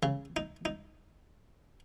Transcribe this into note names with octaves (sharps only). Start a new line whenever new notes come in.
C#3
D#4
D#4